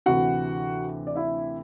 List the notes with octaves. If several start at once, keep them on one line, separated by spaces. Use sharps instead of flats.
D2 C3 E3 F#4 F#5
D5
E4 E5